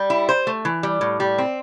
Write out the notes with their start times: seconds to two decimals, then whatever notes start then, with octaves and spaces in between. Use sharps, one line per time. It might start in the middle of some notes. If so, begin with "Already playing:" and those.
Already playing: G3
0.10 E4
0.29 C5
0.47 A3
0.65 E3
0.83 G3
1.01 A2
1.20 G3
1.38 C4